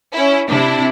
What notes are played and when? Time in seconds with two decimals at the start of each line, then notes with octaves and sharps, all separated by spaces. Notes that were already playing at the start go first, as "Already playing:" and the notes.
0.14 C#4 E4
0.49 C3 D4 E4